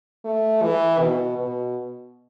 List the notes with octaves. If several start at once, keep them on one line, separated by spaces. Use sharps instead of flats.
A3
E3
B2
B2